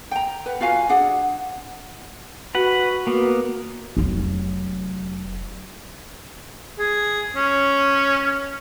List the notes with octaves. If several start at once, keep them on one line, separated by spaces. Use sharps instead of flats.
G5 A#5
B4 F#5
F4 F#4 F5 G#5
D4 G#4 F#5
F#4 B4 F#5
A#3 B3
F1 F#3
G#4
C#4